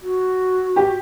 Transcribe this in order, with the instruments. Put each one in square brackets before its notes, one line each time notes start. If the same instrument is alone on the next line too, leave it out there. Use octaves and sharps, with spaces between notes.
[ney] F#4
[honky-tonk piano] G4